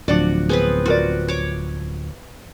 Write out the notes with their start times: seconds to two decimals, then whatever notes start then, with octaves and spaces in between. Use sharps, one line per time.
0.08 D1 F3 D4 F#4 D5 F#5
0.49 B3 C4 G#4 B4
0.86 F4 F#4 A#4 D5
1.28 C#5 D6